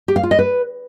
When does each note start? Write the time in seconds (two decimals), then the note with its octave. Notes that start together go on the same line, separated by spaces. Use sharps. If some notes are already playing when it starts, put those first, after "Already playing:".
0.08 G4
0.16 F5
0.23 F4
0.31 D#5
0.39 B4